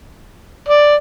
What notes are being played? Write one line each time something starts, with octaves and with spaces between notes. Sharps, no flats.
D5